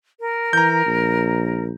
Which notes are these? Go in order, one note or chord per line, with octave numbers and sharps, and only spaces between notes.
A#4
E3 A#5 G6
A#1